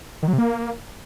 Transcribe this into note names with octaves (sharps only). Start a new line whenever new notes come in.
D#3
F#3
C3
A#3